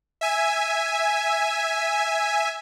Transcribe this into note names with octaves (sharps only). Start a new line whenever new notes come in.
E5 G#5